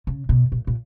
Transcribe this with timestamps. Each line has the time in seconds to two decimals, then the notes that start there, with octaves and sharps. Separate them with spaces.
0.07 C#3
0.29 B2
0.52 A#2
0.67 A#2